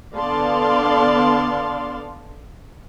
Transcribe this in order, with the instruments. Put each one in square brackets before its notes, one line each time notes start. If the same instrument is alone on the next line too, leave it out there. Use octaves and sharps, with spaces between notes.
[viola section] D3 B3 D5 F5 A5 C6